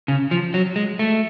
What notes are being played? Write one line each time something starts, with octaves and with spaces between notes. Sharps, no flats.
C#3
F3
F#3
G#3
A3